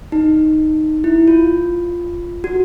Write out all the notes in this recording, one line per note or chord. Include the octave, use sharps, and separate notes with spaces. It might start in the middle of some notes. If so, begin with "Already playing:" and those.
D#4
E4
F4
F#4